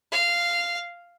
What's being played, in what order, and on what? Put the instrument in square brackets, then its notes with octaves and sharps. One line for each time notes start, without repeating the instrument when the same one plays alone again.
[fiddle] F5